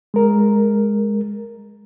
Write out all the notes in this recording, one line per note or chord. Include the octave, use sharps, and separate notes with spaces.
G#3 A#4